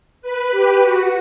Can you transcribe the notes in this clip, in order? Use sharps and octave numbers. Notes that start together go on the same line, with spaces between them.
B4
G4
F#4